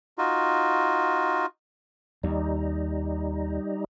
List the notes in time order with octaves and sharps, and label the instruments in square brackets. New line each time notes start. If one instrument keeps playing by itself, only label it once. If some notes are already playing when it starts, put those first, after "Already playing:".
[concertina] D#4 F4 F#4
[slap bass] D#2 [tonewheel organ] G3 D#4